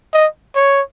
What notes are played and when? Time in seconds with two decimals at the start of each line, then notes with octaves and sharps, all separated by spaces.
0.14 D#5
0.56 C#5